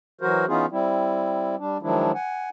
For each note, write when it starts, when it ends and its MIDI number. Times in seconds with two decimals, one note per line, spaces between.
0.21 0.45 52
0.21 0.45 54
0.21 0.45 66
0.21 0.45 70
0.21 0.45 72
0.48 0.66 52
0.48 0.66 59
0.48 0.66 61
0.48 0.66 63
0.48 0.66 65
0.48 0.66 68
0.71 1.55 55
0.71 1.55 60
0.71 1.55 64
1.59 1.78 55
1.59 1.78 62
1.82 2.12 51
1.82 2.12 53
1.82 2.12 54
1.82 2.12 56
1.82 2.12 62
1.82 2.12 64
2.15 2.49 78
2.15 2.49 80